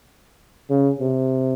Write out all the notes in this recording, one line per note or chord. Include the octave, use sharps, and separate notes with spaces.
C#3
C3